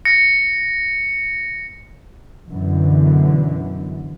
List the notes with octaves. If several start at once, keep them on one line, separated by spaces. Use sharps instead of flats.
A#6 C#7
F#2 B2 D3 E3